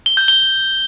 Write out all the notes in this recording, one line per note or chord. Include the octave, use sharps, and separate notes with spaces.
G7
G6
G7